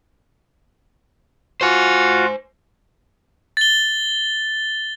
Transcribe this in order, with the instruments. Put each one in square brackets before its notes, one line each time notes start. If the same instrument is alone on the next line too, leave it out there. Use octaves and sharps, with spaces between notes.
[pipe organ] F4 F#4 [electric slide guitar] C5 G#5
[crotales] A6 G7